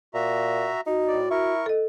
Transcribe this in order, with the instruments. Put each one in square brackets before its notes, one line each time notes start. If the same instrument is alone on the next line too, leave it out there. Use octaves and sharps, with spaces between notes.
[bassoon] A#2 [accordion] F#4 E5 A#5
[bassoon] D#4 [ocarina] F#4
[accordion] A2 D5
[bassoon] E4 [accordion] A#4 C#6
[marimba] A4 D#5